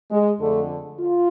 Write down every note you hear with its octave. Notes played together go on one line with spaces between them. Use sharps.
G#3
F2 D3 A3
F4